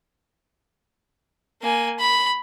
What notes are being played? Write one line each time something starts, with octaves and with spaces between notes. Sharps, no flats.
A#3 G#5
B5